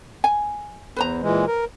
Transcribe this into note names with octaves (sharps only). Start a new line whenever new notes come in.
G#5
E2 B4 C5 A#5
A#2 E3 G#3
A#4